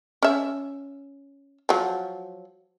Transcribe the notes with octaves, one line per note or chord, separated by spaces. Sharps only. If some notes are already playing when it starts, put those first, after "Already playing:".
C#4 E5
F3 F#3